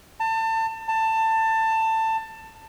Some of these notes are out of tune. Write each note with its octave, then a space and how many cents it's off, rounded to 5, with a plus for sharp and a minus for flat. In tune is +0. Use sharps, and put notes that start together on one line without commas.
A5 +30
A5 +20